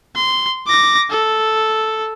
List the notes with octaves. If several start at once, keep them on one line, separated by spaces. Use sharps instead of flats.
C6
D6 A#6
A4